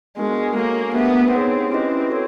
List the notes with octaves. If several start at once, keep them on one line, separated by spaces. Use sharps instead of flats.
G#3 B3 D4 F#4 A#4
A#3 F#4 A4 C#5 F5 G#5
A3 B3 D4 G4 B4 E5
C4 D#4 G#4 C#5
C#4 E4 G4 B4 D#5
F#4 A4 C#5